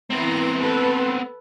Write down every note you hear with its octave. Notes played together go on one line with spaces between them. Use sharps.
E3 B3 C4 E4 A#5
A4 B4